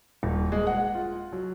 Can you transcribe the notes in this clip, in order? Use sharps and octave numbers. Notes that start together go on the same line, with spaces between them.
D#1
G#3
F#5
F4
F#3